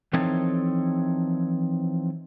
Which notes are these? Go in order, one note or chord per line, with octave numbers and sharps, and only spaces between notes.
E3 F3 C4 D#4 A4 C#5